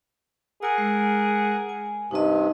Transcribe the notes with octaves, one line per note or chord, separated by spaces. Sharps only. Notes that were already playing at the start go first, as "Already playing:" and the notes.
G#4 A#4 F#5 G#5 E6
G#3
G#5
G2 C3 D#4 B4 D#5